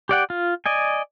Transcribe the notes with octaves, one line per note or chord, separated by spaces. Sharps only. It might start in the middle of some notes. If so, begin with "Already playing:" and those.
G4 D5 F#5 G5
F4
D5 D#5 G#5